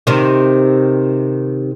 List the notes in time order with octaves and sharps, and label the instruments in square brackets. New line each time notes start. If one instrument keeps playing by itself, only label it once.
[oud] C3 D#3